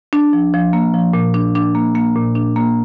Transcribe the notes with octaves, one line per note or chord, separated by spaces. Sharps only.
D4
F3
F3
A#3
F3
A#2
D4
D4
A#3
A#3
A#2
D4
A#3